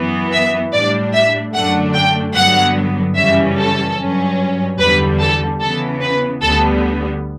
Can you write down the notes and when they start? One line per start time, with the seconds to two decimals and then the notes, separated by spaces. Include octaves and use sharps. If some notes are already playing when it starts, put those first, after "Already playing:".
Already playing: F#2 E3 B3
0.32 E5
0.73 A2 G3 D4 D5
1.13 E5
1.54 F#2 D3 A3 D4 F#5
1.94 G5
2.35 G2 D3 F#3 B3 F#5
3.16 F#2 C#3 E3 G3 C#4 E5
3.57 A4
3.98 G2 F#3 C#4
4.79 E2 D3 G3 B4
5.19 A4
5.60 C#3 E3 B3 A4
6.00 B4
6.41 D2 D3 G3 B3 A4